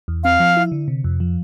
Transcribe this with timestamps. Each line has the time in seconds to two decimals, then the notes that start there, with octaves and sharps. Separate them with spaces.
0.08 E2
0.24 C4 F5
0.40 F3
0.57 E4
0.72 D3
0.88 C3
1.04 F2
1.20 F3